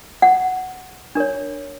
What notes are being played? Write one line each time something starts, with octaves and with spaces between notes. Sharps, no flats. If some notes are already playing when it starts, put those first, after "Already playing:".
F#5
D4 A#4 C#5